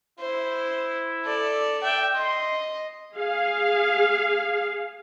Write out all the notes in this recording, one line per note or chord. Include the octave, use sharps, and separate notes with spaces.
E4 C5
A4 D5
D5 E5 G5
D#5 C6
G#4 F5